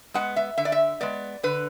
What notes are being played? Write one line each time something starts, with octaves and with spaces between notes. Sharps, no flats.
G#3 B3 F#5
E5
D3 E5
D5
E5
G#3 B3 D5
D3 B4